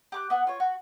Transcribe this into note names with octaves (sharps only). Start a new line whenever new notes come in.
G4 D6 F#6
B3 F#5
F4 C#5
F#4